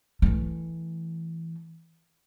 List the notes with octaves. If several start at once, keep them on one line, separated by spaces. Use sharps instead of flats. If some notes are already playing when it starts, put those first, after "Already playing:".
E3 A3